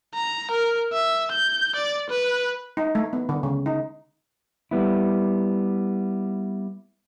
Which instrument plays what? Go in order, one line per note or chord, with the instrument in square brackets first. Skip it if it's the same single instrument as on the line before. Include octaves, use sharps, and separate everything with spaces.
[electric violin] A#5
A#4
E5
G6
D5
B4
[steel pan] D#4
A3
B3
D3
C#3
D#4
[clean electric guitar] G3 B3 E4